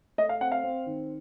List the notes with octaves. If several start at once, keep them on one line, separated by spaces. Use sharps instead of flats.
A3 D#5
F5
C4 F#5
F5
C4
D#3